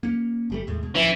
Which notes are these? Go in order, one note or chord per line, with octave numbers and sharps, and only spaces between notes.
A#3 C#4
G1 G3 A3
D#2 A2 G#3
B2
D1 E3 F3 C#4